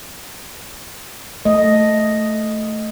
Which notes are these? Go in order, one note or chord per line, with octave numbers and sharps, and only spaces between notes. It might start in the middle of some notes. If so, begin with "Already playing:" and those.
A3 D#5